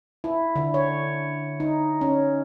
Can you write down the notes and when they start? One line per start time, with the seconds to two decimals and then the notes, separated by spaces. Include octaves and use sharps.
0.24 E4
0.56 D3
0.74 C#5
1.60 D#4
2.01 C#4